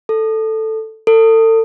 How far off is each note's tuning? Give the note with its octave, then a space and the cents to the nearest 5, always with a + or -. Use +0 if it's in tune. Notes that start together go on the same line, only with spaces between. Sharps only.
A4 +0
A4 +35